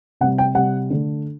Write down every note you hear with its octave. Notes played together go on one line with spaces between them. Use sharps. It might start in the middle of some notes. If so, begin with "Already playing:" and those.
C3 G3 F#5
G5
C3 G3 F#5
D3 A3